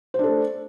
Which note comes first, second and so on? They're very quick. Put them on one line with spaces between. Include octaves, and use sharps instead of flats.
C5 D4 A4 A3